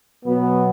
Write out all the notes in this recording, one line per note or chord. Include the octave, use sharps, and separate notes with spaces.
B2 F#3 B3